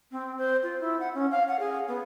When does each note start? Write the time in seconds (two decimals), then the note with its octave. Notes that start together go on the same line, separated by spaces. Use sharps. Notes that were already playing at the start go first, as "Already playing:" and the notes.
0.11 C4
0.38 C5
0.62 F4
0.80 E4
1.00 F#5
1.14 C#4
1.31 F5
1.47 F#5
1.59 G#4
1.88 B3